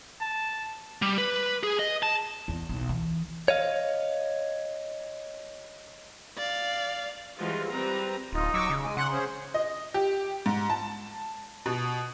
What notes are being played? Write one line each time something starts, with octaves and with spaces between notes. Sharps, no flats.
A5
G3
B4
G#4
D#5
A5
E2
B1
E3
C#5 D#5 F5
D5 F5
E3 F3 G3 G#3 F4 F#4
G3 C4 B4 A#5
D1 D#4 F4
F#3 C#6 D6 E6
C#3
G#3 G#5
C#3 F#5 C6 F#6
C#4 G#4 C5
D#5
G4
G#2
A5
B2